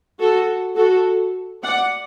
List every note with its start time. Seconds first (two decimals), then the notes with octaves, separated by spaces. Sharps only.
0.20 F#4 A4
0.77 F#4 A4
1.63 D5 F#5